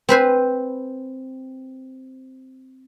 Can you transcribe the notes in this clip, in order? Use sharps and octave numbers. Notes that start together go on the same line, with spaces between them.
C4 B4 C5 G#5